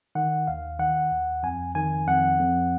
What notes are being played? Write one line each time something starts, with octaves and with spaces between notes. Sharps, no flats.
D#3 F#5
D#2 F5
D#3 F#5
D#2
F2 G#5
D#3 G#5
F2 F#5
F2